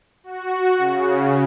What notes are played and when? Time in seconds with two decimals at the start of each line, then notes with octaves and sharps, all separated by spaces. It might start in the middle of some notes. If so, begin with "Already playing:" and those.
0.24 F#4
0.78 C#3